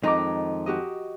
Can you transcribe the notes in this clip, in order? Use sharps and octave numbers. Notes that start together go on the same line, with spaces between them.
F2 D#3 G#3 D#4 A#5 D6
F#4 G4 D#5